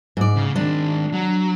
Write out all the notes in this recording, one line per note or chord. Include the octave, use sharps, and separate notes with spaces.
G#2 D5
C#3
D#3 G#3 D4
F#3